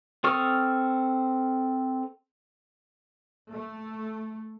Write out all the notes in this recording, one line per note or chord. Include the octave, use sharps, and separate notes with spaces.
C4 A4 C#6 D#6 F6
A3